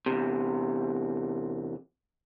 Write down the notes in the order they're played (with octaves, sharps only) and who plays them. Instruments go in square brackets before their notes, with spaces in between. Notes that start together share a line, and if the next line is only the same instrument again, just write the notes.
[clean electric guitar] E2 C3